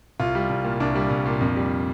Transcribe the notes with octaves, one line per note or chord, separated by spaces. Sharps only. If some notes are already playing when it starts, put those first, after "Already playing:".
C2 F4
G3
C2
A#2
C2 D4
G3
C2
A#2
F2
G3